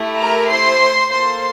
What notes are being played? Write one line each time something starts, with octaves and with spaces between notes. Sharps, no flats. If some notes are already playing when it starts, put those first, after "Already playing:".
Already playing: A3 E4 G4
A#4 A#5
C5 C6
A#3 F4 A4 C5 C6